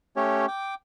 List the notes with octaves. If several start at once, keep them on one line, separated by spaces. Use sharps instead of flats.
A3 C#4 G4 C#5
G5 D6